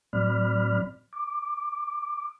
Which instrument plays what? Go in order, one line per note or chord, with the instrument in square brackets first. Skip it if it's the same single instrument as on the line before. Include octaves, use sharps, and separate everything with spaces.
[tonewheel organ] A2 F#3 C4 D5 B5 F6
D6